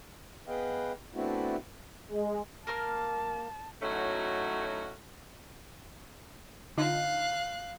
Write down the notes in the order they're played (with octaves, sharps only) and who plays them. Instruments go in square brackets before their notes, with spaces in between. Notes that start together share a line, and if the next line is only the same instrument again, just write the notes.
[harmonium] B3 G#4 B4 D#5 F5 G5
A3 B3 C4 D4 E4 F#4
[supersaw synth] G#3
[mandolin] A#3 A#4 F6 [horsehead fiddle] A5
[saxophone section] A2 F#3 A3 C#4 D#4 F#4
[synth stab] D3 D#4 F4 [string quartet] F5 F#6